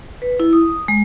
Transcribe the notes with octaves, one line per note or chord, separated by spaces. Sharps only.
B4
E4
D#6
G#3